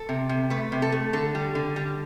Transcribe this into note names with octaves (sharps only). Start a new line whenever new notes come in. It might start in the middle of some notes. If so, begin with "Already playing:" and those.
Already playing: A4
C3
C3
A3 B4
C3
A4
A3
D3 A4
G3
D3
G3